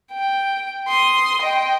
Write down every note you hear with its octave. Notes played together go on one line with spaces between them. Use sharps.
G5
C6 D#6
D#5 G5